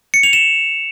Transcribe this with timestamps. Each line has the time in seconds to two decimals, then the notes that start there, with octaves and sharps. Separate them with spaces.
0.14 C#7
0.23 F7
0.33 E7